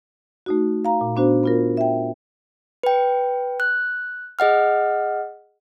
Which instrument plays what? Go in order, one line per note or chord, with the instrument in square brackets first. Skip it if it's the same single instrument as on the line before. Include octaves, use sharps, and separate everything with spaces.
[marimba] A3 D#4 F#4
F5 A#5
A#2
B3 D4 F#4 C5
B3 F4 A#4
E5 G5
[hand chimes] B4 G5
F#6
G#4 D#5 F#5 F6